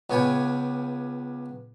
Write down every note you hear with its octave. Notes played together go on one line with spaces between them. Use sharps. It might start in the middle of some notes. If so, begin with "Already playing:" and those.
C#2 B3 C#5 G5 G#5